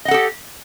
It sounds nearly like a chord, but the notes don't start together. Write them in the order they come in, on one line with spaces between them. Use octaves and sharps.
D#5 F#5 A4 G4